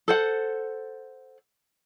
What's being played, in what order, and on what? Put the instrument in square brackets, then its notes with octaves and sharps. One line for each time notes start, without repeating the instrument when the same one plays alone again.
[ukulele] A4 C5 F#5